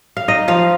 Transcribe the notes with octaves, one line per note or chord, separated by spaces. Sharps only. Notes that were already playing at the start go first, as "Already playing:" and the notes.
F5
D#4 D#5
F3 F5